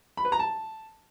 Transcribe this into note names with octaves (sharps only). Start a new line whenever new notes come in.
B5
B4
A#5
A5